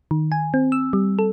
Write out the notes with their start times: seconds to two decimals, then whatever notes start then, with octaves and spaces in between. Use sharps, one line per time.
0.11 D#3
0.32 G#5
0.54 C4
0.72 E6
0.93 G3
1.19 A4